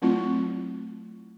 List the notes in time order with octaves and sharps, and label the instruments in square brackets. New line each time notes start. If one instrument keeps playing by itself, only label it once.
[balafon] F#3 A3 C4 E4 F4